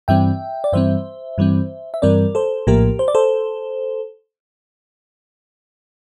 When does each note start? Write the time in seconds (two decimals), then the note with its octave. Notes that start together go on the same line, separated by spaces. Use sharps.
0.08 G2 E3 G3 C4 E5 G5
0.64 D5
0.73 G2 E3 G3 C4 C5 E5
1.38 G2 E3 G3 C4
1.94 E5
2.02 G2 E3 G3 C4 A#4 D5
2.35 A4 C5
2.67 A#1 A2 F3 A#3 G4 A#4
2.99 C5
3.08 D5
3.15 A4 C5